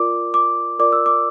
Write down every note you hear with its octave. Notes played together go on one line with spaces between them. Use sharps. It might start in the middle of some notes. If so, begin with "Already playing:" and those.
Already playing: F4 A#4 D5 D6
D6
F4 A#4 D5 D6
E6
D6